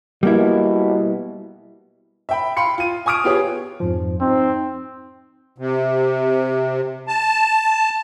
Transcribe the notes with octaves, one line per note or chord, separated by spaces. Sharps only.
B2 G3 A#3 E4
E5 G5 B5
F5 G5 B5 C6 C#7
F4 D#7
G#5 C#6 D#6 F6 D7
B3 F4 G4 G#4 C#5
F2 G#2 F3
C4 D#4
C3
A5